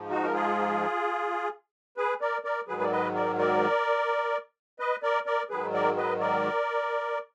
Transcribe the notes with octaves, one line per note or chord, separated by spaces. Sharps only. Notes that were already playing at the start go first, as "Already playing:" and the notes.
Already playing: G#2 F3
D#4 F#4
A#4
F4 G#4
G#4 B4
A#4 D5
A#4 D5
G#2 D#3 F#3 G#4 B4
D5
B4 D#5
A#4 D5
A#4 D5
B4 D#5
A#4 D5
A#4 D5
G#2 D#3 F#3 G#4 B4
A#4 D5
B4 D#5
A#4 D5